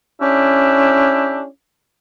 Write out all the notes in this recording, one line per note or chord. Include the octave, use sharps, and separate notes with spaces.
C#4 D4 E4 G4